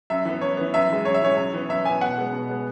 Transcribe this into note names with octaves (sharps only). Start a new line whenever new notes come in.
F#2 E5
E3 B3
F#2 C#5
E3 B3
F#2 E5
E3 G#3
F#2 C#5
E5
E3 G#3 C#5
F#2
E3 B3
F#2 E5
E3 B3 G#5
B2 F#5
G#3 B3
B2
G#3 B3